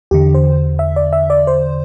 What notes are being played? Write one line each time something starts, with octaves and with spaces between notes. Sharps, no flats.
E2 D3 G4
C5
E5
D5
E5
D5
C5